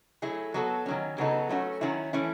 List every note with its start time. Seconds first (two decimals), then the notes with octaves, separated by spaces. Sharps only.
0.22 F#3 A3 E4 G#4
0.54 F#3 B3 F#4 A4
0.86 D#3 F#3 C#4
1.18 C#3 F#3 B3 D#4 A4
1.49 F#3 A3 C#4 F#4
1.81 D#3 F#3 C#4 E4
2.13 E3 A3 C#4 E4